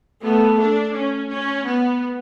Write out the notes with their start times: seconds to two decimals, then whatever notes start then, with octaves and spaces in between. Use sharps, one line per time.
0.23 A3 B3
0.59 D4
0.94 C#4
1.29 C#4
1.65 B3